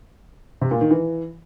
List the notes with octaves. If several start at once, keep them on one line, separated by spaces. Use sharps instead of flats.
C3
A#2
D#3
E3